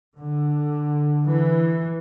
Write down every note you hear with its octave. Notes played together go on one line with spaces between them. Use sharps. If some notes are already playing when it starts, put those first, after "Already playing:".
D3
E3